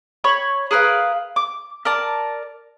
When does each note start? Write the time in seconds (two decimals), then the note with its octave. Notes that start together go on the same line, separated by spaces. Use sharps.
0.24 C#5 B5 C#6
0.71 G#4 A#4 B4 F5
1.36 D6
1.85 A#4 D5 A5